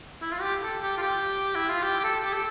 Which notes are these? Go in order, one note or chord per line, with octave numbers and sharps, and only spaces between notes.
E4
F4
G4
A4
G4
F4
G4
E4
F4
G4
G4
A4
G4
A4